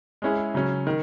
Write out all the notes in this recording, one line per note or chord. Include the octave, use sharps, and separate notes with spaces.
G#3 C#4 E4 G#4
C#3 F#3 C#4
D#3